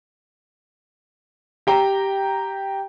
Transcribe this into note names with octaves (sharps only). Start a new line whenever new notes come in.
G4 G5 A#5